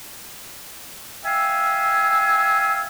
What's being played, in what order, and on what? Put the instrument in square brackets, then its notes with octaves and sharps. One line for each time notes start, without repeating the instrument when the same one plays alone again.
[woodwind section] E5 F5 G5 G#5 E6